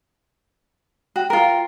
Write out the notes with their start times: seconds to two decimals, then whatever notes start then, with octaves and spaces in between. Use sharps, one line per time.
1.16 F#4 G5
1.30 F4 A#4